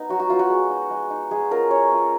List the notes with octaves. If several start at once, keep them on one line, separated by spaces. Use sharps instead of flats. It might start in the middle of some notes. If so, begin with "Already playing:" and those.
Already playing: B3 D#4
F#3 F#4
F#4
B3 D#4 F4
F#4
G#3
D#4
G#3
D#4
G#3 G#4
C#4 F4 A#4
G#3 C#5
C#4 F4